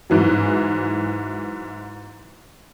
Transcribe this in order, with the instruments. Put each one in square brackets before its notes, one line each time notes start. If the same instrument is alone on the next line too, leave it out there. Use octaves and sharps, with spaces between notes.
[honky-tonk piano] G#2 E3 F#3